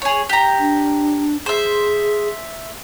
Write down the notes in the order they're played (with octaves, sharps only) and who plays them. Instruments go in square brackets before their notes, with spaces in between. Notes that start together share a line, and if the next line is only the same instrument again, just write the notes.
[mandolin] G#4 C#5
G4 A#5
[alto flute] D4
[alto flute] G#4 [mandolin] C5 E5